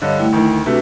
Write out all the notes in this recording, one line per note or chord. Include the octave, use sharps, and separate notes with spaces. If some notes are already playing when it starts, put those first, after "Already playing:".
G2 D3 C#5 D#5 F5
A3 E4 G5
D2 D#3
C3 A3 D4 F#4 B4